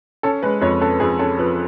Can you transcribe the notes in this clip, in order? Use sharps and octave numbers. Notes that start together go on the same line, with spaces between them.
C#4 A4
G#3 B4
F2 C#5
C#4 A4
F2 G#4
C#4 A4
F3 B4